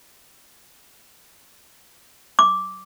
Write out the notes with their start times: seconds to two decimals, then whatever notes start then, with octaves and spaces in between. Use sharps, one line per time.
2.39 D6